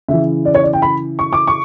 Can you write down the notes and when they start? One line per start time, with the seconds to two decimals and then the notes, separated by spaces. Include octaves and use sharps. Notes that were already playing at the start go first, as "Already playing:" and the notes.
0.08 C#3 E3 E5
0.45 D5
0.55 C#5
0.63 D5
0.73 G5
0.82 B5
1.19 C#6
1.33 D6
1.47 C#6